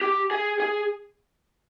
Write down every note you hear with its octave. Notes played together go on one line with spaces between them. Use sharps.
G4
G#4
G#4